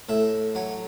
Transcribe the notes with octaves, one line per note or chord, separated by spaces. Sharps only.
A2 E5
F#3 C#5